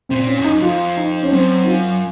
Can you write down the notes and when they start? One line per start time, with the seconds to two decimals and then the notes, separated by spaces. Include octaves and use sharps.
0.09 C3 C4
0.16 A#2
0.27 C#4
0.39 F#2
0.45 D#4
0.55 F#2
0.62 F2 F4
0.97 D#4
1.23 C#4
1.32 F#2 C4
1.64 D#4
1.67 F4